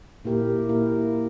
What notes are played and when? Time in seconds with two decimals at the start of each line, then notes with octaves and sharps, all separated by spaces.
0.24 A#2 A#3 E4 G4 A#4
0.69 A#2 A#3 E4 G4 A#4